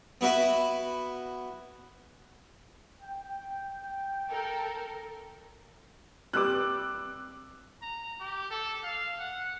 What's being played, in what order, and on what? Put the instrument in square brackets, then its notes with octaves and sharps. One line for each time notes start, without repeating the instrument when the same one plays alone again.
[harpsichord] B3 E4 F#4 B4
[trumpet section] G5
[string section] A4 A#4
[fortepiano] C3 G3 B4 [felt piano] D6 E6 F#6
[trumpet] A#5
G4
A4
F5
F#5